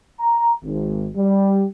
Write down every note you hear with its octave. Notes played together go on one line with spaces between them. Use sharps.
A#5
G#1
G3